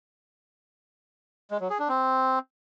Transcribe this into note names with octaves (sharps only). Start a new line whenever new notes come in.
G#3
F#3
G#4
D4
C4